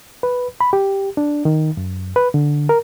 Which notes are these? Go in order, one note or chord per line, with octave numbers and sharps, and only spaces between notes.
B4
B5
G4
D4
D#3
F#2
B4
D3
A#4